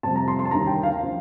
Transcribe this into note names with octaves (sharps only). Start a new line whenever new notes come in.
F2 C3 G3 A5
A#5
C6
C6
A5
D#2 D3 G3 A#5
G5
F5
F3